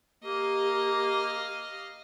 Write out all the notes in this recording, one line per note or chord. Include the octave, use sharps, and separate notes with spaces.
A#3 G4 D#5 F5